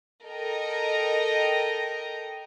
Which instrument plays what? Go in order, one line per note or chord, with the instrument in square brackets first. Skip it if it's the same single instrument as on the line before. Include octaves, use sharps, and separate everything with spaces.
[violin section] A4 A#4 D#5 G5 A#5